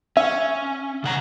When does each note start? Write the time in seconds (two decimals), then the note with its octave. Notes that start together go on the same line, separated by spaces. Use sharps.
0.17 C#4 E5
1.04 C#3 F#5 A#5